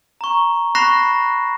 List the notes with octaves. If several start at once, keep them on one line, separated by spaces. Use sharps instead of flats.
A#5 C#6
B5 C#6 F#6 A#6 C7 E7